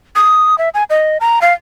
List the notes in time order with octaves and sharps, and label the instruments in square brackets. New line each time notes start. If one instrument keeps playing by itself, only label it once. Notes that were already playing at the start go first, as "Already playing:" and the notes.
[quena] D#6
E5
G#5
D#5
A#5
F5